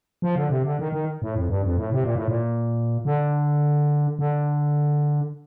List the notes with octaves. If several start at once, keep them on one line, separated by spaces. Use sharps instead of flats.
F3
D3
C3
D3
D#3
D#3
A2
F2
G2
F2
A2
C3
A#2
A2
A#2
D3
D3